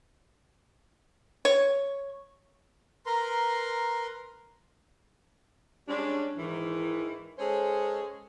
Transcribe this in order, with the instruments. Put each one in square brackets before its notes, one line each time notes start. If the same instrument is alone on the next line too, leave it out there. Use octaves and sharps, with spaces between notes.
[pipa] C#5
[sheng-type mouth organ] A#4 B4 A#5 C6
[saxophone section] G3 G#3 C#4 D4
G#2 D#3 E3
G#3 C#4 G#4 A4 C5 C#5